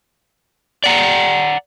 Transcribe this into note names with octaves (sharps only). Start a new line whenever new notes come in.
D5 F#5 A#5